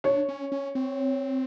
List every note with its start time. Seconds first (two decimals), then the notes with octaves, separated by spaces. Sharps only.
0.04 D4 C#5
0.29 C#4
0.52 C#4
0.75 C4